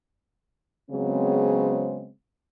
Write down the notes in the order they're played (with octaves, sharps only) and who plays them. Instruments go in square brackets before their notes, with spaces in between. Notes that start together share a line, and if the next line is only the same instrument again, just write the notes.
[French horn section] C#3 F#3 G#3 B3 C4